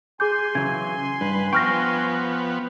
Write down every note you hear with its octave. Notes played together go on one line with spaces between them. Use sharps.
G#4 G#5 C6 D6 G6
C#3 E3 F#3 G#6
G2 B4
F3 B3 G5 C#6 F6 A#6